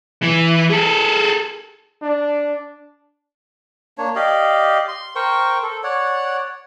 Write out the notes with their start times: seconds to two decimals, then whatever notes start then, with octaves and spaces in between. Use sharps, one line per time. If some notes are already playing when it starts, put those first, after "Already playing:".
0.23 E3
0.70 G#4 A4
2.02 D4
3.98 A#3 D4 C#5
4.16 G4 D5 D#5 F5
4.88 C6
5.16 A#4 C5 G5 C#6
5.63 A4
5.84 C#5 D5 F#5